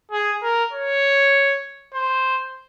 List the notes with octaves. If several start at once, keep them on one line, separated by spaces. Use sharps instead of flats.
G#4
A#4
C#5
C5